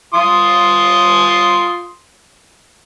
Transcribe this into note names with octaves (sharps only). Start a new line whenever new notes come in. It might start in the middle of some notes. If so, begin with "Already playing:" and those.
F4 C6 D#6